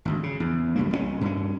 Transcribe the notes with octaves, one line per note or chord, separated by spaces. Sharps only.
G#1 D2
C#3
E2
C#2 G2 A#3
C2 F#3 C#4
G2 C#4